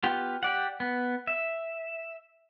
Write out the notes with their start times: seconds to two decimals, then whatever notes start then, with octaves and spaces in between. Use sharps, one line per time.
0.03 B3 F4 G4
0.43 G4 D5 F#5
0.80 B3
1.27 E5